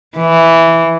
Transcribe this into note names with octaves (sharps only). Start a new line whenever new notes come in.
E3